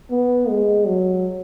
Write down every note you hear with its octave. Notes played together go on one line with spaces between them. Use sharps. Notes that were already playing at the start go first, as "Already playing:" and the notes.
B3
G#3
F#3